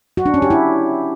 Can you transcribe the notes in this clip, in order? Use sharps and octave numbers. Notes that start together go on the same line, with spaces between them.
F#4
D4
C#4
G4
E4